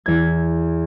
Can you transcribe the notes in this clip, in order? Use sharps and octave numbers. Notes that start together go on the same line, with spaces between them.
E2 G#6